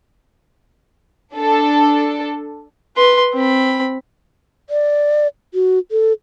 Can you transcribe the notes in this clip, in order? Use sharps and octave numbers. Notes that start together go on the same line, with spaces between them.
D4 A4
B4 C6
C4 B5
D5
F#4
A4